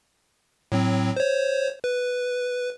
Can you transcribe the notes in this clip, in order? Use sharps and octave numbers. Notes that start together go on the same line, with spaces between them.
A2 F#3 C4
C5 C#5
B4